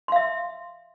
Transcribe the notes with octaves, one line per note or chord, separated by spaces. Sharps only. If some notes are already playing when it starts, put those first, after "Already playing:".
E5 F5 C6